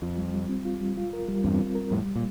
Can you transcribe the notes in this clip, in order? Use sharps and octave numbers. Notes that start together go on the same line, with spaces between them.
F2 F4
G3
G3
C4
F4
G3
F4
A#4
G3
E2 G2 C4
F4
A#4
F2 A2 G3
A#2